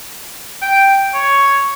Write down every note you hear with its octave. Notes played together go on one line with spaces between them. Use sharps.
G5
C#5